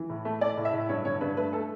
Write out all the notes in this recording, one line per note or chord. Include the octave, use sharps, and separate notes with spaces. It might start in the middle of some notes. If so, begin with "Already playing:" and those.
Already playing: E3
A2
A3
A3 D5
A2
E5
A2
G2 C#5
D3 C#5
G2 B4
A3 B4
A3 A4